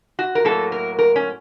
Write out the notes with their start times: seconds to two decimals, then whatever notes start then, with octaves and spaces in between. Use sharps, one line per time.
0.19 F#4
0.35 A#4
0.45 A2 F#3 A#3 A4
0.72 A#4
0.99 A#4
1.16 C#4